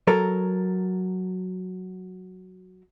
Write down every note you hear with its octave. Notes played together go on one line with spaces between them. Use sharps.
F#3 A4 A#4